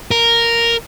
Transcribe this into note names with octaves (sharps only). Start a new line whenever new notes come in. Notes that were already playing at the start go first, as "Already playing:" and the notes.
A#4